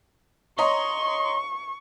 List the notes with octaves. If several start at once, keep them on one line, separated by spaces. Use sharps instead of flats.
C#5 D#5 A#5 C6 C#6